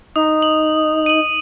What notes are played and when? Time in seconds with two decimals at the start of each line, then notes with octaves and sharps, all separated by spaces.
0.16 D#4 D#6
0.42 F#7
1.06 D#7 F#7